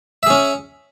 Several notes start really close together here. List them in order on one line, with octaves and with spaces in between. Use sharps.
E5 G#4 C#4